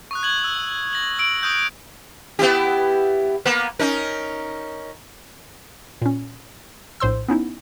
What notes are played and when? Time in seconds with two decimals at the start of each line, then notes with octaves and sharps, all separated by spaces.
0.11 C#6 D#6 F#6
0.23 G#6 F#7
0.44 E6
0.93 A#6 F#7
1.19 E6 D7 F#7
1.43 C#6 D#6 F#6 G6
2.39 B3 E4 G4
3.45 A#3 B3
3.79 C#4 D#4 A#4
6.02 A#2 C#4
7.00 A#1 A2 C5 C6 E6
7.28 B3 C#4 D#4 E4